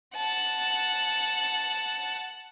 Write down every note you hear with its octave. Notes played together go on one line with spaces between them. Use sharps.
F#5 A5